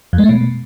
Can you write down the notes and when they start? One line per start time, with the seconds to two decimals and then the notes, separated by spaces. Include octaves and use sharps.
0.13 F2
0.18 G#3
0.24 A3
0.29 B2